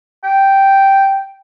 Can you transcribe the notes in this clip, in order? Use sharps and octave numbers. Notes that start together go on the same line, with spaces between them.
G5